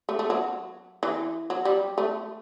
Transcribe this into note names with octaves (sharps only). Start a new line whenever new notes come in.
A3
A3
F#3
E3
F#3
G3
A3